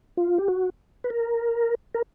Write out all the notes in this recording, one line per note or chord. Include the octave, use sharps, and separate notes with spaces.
F4
G4
F#4
B4
A#4
A#4